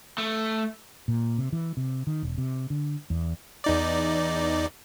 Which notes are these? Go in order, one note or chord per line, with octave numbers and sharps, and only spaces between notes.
A3
A#2
C3
E3
C3
D#3
E1
C3
D3
E2
E2 D#4 D5